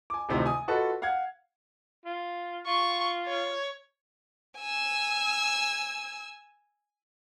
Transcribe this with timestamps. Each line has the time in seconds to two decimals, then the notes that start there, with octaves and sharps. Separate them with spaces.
0.10 G#5 D6
0.29 A1 D2 A2 C3 D#3 F3
0.46 G#5 D#6
0.68 F4 F#4 A4 B4 D#5
1.02 F5 F#5 F6 G#6
2.05 F4
2.67 F4 C#6
3.28 C#5
4.59 G#5 E6